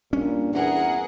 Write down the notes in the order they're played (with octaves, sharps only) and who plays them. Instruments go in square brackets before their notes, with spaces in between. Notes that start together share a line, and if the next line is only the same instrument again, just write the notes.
[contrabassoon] G2 [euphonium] A#2 [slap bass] C#4
[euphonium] E2 [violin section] G#4 A#4 F#5